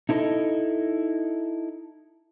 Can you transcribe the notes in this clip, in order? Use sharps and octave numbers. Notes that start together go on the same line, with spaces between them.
D#4 E4 A4 A#4 D#5